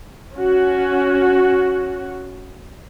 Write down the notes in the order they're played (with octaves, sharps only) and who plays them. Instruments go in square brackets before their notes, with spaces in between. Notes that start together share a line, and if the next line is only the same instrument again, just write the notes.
[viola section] C#4 F#4